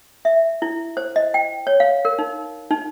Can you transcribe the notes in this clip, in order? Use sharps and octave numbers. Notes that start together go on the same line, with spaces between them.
E5
E4
C5
D#5
G5
C#5
F5
A#4
D#4
D#4